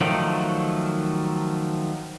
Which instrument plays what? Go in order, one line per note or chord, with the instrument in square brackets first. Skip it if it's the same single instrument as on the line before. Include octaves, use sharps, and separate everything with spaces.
[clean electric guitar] D#3 F3 F#3 A3